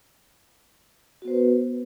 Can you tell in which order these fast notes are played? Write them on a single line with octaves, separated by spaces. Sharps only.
F#4 B3 C5 B4